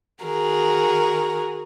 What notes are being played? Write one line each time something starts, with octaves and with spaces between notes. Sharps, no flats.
D#3 F#4 G#4 A#4